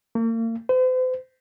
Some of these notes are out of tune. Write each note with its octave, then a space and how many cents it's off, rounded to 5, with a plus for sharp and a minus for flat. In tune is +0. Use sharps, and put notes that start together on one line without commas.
A#3 -40
C5 -45